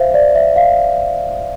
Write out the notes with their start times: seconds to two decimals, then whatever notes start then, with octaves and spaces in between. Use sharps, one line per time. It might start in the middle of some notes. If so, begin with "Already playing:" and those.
Already playing: C5 E5 F5
0.14 D5
0.35 E5
0.56 F5